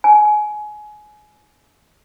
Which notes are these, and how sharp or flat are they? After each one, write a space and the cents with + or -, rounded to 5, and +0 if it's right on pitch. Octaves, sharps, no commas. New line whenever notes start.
G#5 +25